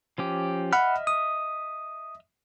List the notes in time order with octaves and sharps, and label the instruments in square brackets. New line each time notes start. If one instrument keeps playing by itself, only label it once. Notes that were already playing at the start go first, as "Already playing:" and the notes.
[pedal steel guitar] F3 C#4 G4
[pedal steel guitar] D#5 E5 F6 [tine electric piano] F#5 B5
[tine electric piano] D#6